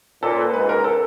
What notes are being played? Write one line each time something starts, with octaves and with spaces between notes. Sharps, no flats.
A#2 A4
B4
G#2 B4
A#4
A4